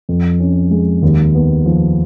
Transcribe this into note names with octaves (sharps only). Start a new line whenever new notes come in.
F2
C#4
G#3
D#2
B3
F3